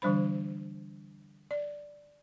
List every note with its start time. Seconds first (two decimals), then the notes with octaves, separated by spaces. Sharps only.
0.02 D3 E3 G3 D4 C5 B5
1.51 D5